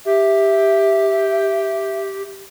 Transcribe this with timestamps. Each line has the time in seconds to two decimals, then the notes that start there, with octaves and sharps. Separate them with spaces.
0.06 G4 E5